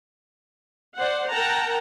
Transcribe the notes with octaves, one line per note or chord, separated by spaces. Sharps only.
C5 D5 F#5
A#4 F#5 G5 A5 A#5